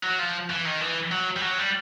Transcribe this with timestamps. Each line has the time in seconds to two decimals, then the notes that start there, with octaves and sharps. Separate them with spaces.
0.04 F#3
0.19 F3
0.50 E3
0.66 D#3
0.81 E3
1.11 F#3
1.36 G3
1.42 F#3
1.59 G3